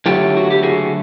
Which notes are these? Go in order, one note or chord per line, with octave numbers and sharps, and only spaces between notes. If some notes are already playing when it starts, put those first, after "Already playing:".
D3 F#3 A3 F4 G4
F#4
G4
F#4 G#4